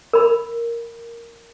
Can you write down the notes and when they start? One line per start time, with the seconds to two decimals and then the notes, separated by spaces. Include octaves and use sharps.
0.13 A#4 B5